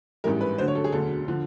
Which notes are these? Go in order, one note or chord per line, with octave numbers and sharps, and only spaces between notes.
A1 G#2 E3 G3 A#4
B4
D2 D3 F#3 C5
C#5
A4
G#4
E1 D2 D3 F#3 A4
D3 F3